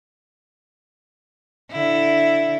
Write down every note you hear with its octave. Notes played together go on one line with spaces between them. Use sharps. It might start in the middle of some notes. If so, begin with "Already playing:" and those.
D3 E4